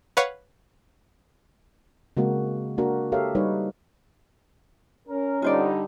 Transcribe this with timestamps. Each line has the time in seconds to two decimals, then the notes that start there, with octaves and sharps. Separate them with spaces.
0.17 B4 C#5 F5 F#5 C#6
2.17 C#3 G#3 A#3 C4 F#4 A#4
2.78 A#3 D4 F#4 A#4
3.12 G4 A4 A#4 C#5 E5 F5
3.35 G3 D#4 B4 C#5
5.08 C#4 A#4
5.42 D3 G3 D#4 F4 C5 D5